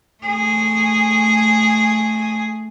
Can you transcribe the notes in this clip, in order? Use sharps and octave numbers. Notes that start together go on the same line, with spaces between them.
A3 G#4